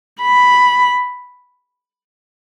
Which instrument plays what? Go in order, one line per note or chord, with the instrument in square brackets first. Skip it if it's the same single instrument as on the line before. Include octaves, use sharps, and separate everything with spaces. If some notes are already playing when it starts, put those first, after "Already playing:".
[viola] B5